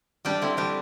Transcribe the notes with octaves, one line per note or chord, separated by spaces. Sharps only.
G3 D4 G4
D3 C4 E4
G3 D4 G4